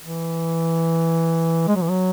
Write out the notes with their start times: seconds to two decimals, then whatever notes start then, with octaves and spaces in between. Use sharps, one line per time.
0.02 E3
1.68 G#3
1.75 F#3
1.83 E3
1.90 F#3